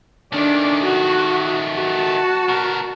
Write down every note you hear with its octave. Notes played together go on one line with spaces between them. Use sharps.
D#3 A3 D4 D5
F#4
F#4 A5
B2 A#4